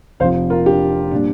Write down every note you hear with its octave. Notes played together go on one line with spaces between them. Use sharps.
F1 F2 F3 C5 F5
F4 A#4
D4 G4
A#2 G3 D4